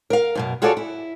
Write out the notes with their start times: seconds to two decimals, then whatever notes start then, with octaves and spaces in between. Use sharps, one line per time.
0.10 A#4 F5
0.35 F#2 B2 A#3
0.62 F4 F#4 G#4 A4 C#5 D5
0.77 E4